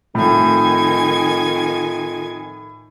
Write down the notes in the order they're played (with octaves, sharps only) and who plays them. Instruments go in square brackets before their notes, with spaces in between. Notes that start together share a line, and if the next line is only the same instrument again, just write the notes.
[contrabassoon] F2 [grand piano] A2 [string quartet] D#3 G#5 G#6